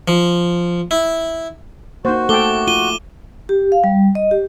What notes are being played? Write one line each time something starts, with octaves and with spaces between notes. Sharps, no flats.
F3
E4
A#3 D#4 F#4 C5
A3 A4 G5 D6 G7
F4 D#7 G7
G4
F5
G3
D#5
G4